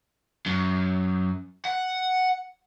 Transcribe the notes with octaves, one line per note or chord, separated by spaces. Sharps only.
F#2
F#5